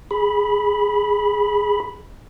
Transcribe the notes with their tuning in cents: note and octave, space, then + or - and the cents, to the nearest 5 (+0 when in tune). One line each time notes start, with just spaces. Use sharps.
G#4 +0 B5 -5